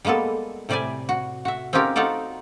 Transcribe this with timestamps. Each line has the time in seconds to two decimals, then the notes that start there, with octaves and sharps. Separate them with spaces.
0.05 G3 G#3 A#3 B3 A4
0.69 A2 C3 G3 D5 E5 G#5
1.09 F#4
1.45 F#4 E5
1.73 C4 C#4 D#4 F4 G4 A#4
1.96 D#4 F4 F#4 A4 D5